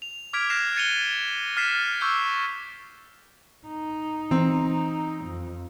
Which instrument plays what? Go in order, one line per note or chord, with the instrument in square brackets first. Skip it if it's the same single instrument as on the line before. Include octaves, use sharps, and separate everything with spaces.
[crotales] F7
D6 F6 G#6 B6 D7 F7
F6 F#6 A#6 C7 E7
G#6 A6 C#7 D#7 F7 G7
F6 F#6 A6 B6 C7 E7
C#6 D6 E6 G6 C7
[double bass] D#4
[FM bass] E3 [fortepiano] C4
[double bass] F2